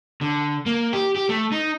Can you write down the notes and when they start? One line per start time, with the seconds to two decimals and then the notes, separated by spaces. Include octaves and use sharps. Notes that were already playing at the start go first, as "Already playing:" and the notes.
0.21 D3
0.66 A#3
0.93 G4
1.16 G4
1.29 A3
1.52 D#4